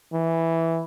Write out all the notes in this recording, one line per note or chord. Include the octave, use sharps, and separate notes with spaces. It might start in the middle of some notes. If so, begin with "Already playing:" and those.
E3